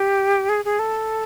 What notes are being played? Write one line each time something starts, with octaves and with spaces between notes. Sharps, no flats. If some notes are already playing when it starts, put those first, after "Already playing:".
Already playing: G4
G#4
G#4
A4